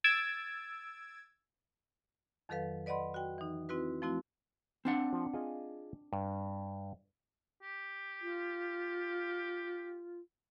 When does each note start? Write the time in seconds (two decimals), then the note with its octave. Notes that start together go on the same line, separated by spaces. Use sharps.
0.04 E6 G#6 A6 D7
2.49 F2 D#3 F#3 A4 B4 F5
2.86 B4 D5 D#5 F#5 B5 C6
3.14 F#4 G5
3.38 E3 D#4
3.69 C4 E4 F#4 B4
4.02 F3 A3 C4 E4 F#4
4.85 C4 D4 F#5
5.13 F3
5.34 F4 G#4 D#5
6.13 G2
7.62 G4
8.21 F4